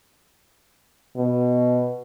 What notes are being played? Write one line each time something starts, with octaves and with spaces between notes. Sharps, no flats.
B2